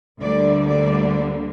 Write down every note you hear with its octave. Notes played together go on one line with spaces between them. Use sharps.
D2 D3 G3 A#3 D5
D5